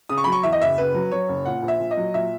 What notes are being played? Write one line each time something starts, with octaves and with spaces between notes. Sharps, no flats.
C#3 D#6
C#6
F#3 B5
C#6
E2 E5
D#5
F#1 E5
F#1 B4
F#3
F#3 C#5
F#1
A#2 F#5
A#1
E5
A#2
D#5
F#3
A#2 E5